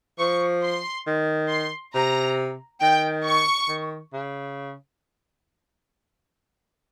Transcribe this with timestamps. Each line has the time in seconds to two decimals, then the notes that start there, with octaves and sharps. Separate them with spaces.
0.19 F3 C#6
0.63 C6
1.07 D#3
1.50 C6
1.95 C3 A#5
2.81 D#3 G5
3.25 C#6
3.68 D#3
4.13 C#3